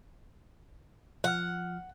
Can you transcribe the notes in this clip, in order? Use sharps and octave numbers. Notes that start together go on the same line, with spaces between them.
F3 F#5 F6